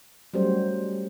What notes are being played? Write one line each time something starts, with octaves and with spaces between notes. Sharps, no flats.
F#3 G3 A3 C#4 G4 C5